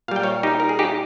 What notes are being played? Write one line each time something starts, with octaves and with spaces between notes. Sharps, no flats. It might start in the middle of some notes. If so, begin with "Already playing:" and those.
A#2 G3 F5 G5
C#5 F5
D#4 G4
A#4
G#4
D#4 G4